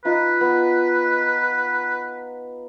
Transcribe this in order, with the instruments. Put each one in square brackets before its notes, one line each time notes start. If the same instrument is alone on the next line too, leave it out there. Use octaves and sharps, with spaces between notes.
[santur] D#4 F4 [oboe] B4
[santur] B3